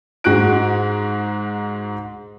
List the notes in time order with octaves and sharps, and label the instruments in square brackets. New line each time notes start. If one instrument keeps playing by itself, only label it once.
[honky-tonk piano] G#2 G#3 F#4 F#6 D7